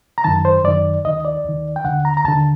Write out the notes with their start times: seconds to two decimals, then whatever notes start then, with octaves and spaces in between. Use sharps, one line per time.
0.18 A#5
0.24 F#2 D#3 A5
0.45 C5
0.64 F#2 D#3 D5
1.05 D#2 D#3 D#5
1.25 D5
1.45 D#2 D#3
1.76 G5
1.84 D#2 D3 F#5
2.05 A#5
2.17 A#5
2.25 D#2 D3 A5